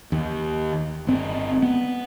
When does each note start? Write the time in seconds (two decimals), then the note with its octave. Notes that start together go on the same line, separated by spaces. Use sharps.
0.12 D#2
1.07 G1 C4
1.62 B3